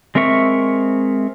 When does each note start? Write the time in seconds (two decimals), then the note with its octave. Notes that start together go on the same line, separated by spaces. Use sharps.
0.15 G#3 C4 A#4 E5 C#6